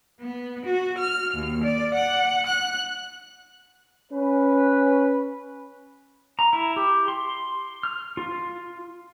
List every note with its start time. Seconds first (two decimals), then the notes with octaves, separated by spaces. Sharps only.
0.20 B3
0.66 F#4
0.99 F6
1.33 D#2
1.64 D5
1.94 F#5
2.47 F#6
4.12 C#4 B4
6.39 A#5
6.53 E4
6.76 G4
7.08 C6
7.83 F6
8.17 F4